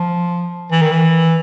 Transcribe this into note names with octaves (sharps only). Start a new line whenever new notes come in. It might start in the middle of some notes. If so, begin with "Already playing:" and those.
Already playing: F3
E3
D#3
E3